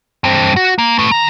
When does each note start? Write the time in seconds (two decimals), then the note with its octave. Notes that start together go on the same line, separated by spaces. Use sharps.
0.24 G2 C4
0.56 F#4
0.78 A#3
0.99 A3 B4
1.11 D#3 A#5